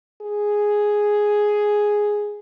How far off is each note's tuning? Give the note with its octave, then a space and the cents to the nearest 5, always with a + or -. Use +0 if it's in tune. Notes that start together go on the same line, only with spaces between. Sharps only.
G#4 +0